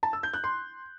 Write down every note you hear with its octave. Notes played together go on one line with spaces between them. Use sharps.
A5
E6
G6
F#6
C6